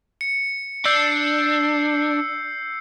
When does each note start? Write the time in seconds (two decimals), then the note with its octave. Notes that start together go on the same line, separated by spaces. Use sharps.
0.21 C#7
0.85 D4 E6 G6 C7